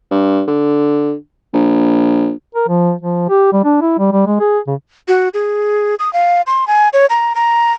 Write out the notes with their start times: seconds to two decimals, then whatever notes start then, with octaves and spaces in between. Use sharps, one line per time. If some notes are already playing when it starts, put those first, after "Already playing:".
0.11 G2
0.48 D3
1.54 A#1
2.55 A#4
2.68 F3
3.01 F3
3.29 G4
3.53 G3
3.64 D4
3.81 E4
3.99 G3
4.12 G3
4.27 G#3
4.40 G#4
4.67 C#3
5.08 F#4
5.34 G#4
5.99 D#6
6.13 F5
6.47 C6
6.67 G#5
6.93 C#5
7.10 A#5
7.35 A#5